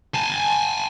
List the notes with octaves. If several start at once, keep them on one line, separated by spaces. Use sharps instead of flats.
G#5 A5